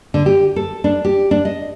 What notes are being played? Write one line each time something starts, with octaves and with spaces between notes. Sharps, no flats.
D3
G4
A4
D4
G4
D4
D#5